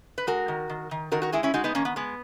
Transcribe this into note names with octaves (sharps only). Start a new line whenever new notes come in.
B4
G#3 F#4 A#4
D#3
D#3
D#3
D#3 F#4 A#4
F#4 A#4
G#3 E4 G#4
C#4 E4
G#3 D#4 F#4
B3 D#4
D#3 A#3 C#4
B3
G#3 B3